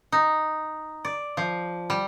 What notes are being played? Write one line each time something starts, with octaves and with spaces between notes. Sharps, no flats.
D#4
D5
F3
G3